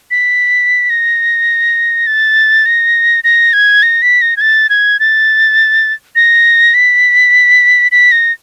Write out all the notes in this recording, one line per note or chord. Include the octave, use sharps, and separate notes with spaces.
B6
A#6
A6
A#6
A#6
G#6
A#6
B6
A#6
G#6
A6
G#6
A6
A#6
B6
B6
A#6